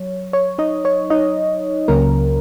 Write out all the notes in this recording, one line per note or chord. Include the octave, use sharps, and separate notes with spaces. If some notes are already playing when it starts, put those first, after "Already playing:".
Already playing: F#3 C#5
C#5
D#4 D#5
C#5
D#4 D#5
C#2 C#3 F#3 A#3 C#4 A#4